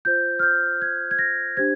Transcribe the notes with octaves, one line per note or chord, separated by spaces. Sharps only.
F4 C5 G6
F6
G6
G#6
G#6
A#6
D4 G4 C5 G#6